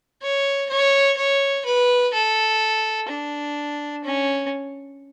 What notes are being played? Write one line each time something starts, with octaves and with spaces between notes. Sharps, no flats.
C#5
C#5
C#5
B4
A4
D4
C#4